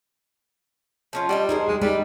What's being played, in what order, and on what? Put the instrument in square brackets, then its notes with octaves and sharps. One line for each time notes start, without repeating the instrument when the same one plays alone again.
[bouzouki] F3 C#4 F4
[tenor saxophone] G3 [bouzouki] D4 D#5 F#5
[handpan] D#4 [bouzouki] G#4 A#4 C5
[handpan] G3 G4 [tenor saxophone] G#3
[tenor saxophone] G3 [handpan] G#3 D#4 [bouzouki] B4